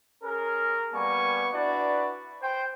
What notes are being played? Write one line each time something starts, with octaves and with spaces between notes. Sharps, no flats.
C#4 G#4 A#4
G3 A#3 B3 G#5 C#6
D4 E4 F#4 B4 D5
C5 G5